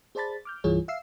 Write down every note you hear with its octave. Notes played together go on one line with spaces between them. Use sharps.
G#4 C5 D5 A5 B5 A6
D6 F6 G6
C2 G2 E3 F4 G#4 C#5
E5 F5 E6 C7